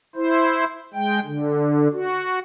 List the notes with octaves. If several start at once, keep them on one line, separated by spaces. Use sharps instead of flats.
E4 C5
G#3 G5
D3
F#4